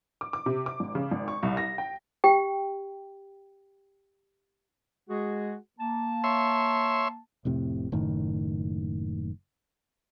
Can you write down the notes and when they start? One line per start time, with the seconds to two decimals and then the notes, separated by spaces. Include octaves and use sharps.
0.21 D6
0.33 D6
0.46 C3
0.66 D6
0.80 G#1
0.95 C#3
1.11 G#1
1.28 C#6
1.43 C2
1.57 A#6
1.78 G5
2.24 G4 G5
5.09 G#3 F#4 G#4
5.79 A#3 A5
6.24 C#5 E5 C6
7.45 F1 A2 C3
7.92 F#1 A2 D#3